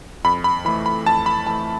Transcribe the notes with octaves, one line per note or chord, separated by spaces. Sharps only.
F2 B5
B5
E3 A3 B5
B5
F2 A5
B5
E3 A3 A5